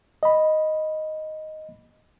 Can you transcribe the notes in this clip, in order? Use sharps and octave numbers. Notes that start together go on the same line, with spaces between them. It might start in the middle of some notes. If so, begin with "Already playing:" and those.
D#5 B5